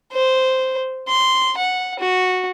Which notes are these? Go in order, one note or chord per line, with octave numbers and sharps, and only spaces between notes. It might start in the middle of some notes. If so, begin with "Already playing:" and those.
C5
C6
F#5
F#4